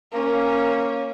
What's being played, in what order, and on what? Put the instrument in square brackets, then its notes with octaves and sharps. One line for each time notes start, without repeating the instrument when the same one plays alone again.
[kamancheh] A#3 C#4